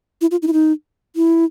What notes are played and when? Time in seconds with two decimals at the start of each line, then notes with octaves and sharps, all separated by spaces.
0.21 E4
0.31 F4
0.42 D#4
0.47 E4
0.53 D#4
1.16 E4